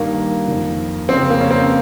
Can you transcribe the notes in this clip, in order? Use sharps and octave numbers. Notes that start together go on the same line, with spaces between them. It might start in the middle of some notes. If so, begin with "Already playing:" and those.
Already playing: G2 D#3 A#3
F2 D#3
F2 C#3 C4
A#3
C#4
C4